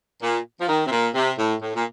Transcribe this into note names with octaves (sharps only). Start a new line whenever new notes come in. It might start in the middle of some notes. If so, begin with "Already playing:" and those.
A#2
F3
D#3
C3
A#2
C3
A2
A2
A#2